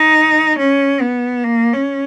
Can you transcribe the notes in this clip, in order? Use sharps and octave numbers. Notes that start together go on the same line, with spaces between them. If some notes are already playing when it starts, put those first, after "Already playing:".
Already playing: D#4
C#4
B3
A#3
C#4